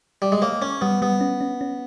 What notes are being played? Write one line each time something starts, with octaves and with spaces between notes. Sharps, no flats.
G3
G#3
A#3 C#5
C#4 C#5
G3 B3
G3 B3
C#4
C#4
C#4